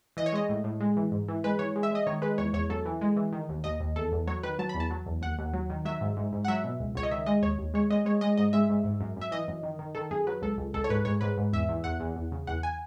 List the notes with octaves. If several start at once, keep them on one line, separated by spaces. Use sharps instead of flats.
E3 D#5
C#5
G#3 D#5
A2
A2
G#3
E3
G#2
E3
G#3 B4
E3 C#5
G#3
E5
G#3 D#5
D#3 C#5
G#3 B4
E2 C#5
E2 C#5
F#2 A4
E3
G#3
E3
D#3
D#2
D#2 D#5
D#2
E2 A4
E2
F#3 C#5
D#3 B4
F#3 A5
B5
E2
A5
F#3
E2
D#2 F#5
D#2
F#3
D#3
F#3 E5
G#2
G#2
G#2
F#5
F#3 E5
B2
C#2
C#2 C#5
D#5
D#3 E5
G#3 D#5
D#2 C#5
D#2
G#3 C#5
G#3 D#5
G#3 C#5
G#3 D#5
G#2 D#5
G#3 E5
G#2
G#2
F#2
F#2
E5
E3 D#5
F#2
D#3
D#3
D#3 A4
F#2 G#4
F#3 B4
C#2 A4
C#2
C#2 A4
C#5
G#2 B4
G#2 C#5
G#2 B4
G#2
E2 E5
E2
E2 F#5
E2
E2
C#3
E2 F#5
G#5